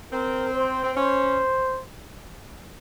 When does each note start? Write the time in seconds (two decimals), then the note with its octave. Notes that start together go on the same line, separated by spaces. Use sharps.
0.12 C4 A#4
0.53 C5
0.84 C4
0.95 C#4 C5